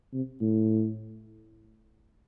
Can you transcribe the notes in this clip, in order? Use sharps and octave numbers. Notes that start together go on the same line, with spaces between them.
C3
A2